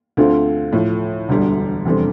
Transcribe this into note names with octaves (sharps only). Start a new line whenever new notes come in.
D2 D3 A3 C4 F4
A2 F3 A3
E1 D2 D3 G3 D4
F1 E2 D3 G3 C4